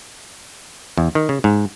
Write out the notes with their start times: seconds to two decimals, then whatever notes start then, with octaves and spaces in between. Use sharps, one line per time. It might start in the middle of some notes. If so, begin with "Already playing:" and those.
0.98 E2
1.15 D#3
1.29 C#3
1.44 G#2